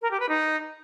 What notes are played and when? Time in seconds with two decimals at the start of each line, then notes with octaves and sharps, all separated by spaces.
0.02 A#4
0.11 G4
0.20 B4
0.29 D#4